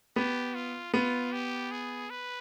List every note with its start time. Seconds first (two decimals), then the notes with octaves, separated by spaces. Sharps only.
0.16 B3 G4
0.55 F4
0.94 B3 F4
1.32 G4
1.71 G#4
2.10 B4